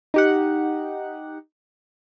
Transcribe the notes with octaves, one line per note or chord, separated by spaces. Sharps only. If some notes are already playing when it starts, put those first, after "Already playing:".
D#4 G4 F#5